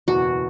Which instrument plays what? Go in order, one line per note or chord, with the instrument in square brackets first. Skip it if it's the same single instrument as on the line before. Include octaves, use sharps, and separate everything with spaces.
[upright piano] F#1 E2 B2 [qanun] F#4